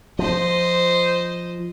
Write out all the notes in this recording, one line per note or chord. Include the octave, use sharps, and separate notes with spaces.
F3 C5 D#5